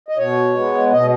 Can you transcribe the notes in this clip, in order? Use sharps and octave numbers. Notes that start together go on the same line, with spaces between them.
D#5
B2 C#5
G#3 B3
B2 D#5